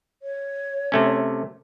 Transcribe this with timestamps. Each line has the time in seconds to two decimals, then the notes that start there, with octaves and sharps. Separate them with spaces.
0.22 C#5
0.92 C3 A3 C#4